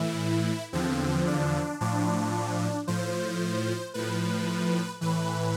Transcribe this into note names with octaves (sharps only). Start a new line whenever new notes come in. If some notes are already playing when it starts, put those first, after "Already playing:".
Already playing: A2 E3 E4
E2 D3 F3 C4
D4
A2 F3 D4
A2 F3 C5
A2 F3 B4
A2 E3 B4